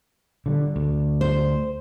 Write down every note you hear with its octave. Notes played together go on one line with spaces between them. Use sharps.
D3 F3 G3
D2
C5